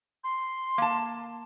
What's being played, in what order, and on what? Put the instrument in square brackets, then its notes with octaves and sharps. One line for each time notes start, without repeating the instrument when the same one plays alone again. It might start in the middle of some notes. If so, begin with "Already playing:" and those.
[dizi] C6
[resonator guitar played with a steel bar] A#3 A5